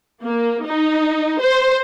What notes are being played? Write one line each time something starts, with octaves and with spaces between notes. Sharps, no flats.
A#3
D#4
C5